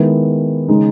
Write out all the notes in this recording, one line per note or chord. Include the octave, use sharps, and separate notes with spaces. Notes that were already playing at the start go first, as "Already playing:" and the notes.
Already playing: D#3 G#3 B3 E4
C#3 G#3 D#4